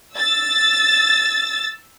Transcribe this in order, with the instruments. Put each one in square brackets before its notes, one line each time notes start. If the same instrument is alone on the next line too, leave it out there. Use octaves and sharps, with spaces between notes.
[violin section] E6 A6